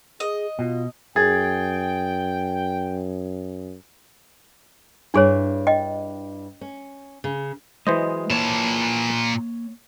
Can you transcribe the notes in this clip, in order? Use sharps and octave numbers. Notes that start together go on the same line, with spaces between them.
G#4 D#5
B2 F4
F#2 G#4 G5 G#6 A6
G2 D4 E4 G#4 C#5
D#5 G5
C#4
C#3
E3 F#3 G#3 C5 D#5
A#2 A#3 C#5 A5